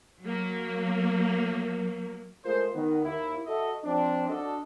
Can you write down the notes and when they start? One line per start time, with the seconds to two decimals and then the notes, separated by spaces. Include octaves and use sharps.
0.22 F#3 A#3
2.45 G#3 A3 F4 G#4 A#4 C5
2.74 D#3 B3
3.05 D#2 A#3 E4
3.46 F#4 A4 D#5 E5
3.84 F3 C4 D4
4.28 D4 F#4 A4 D#5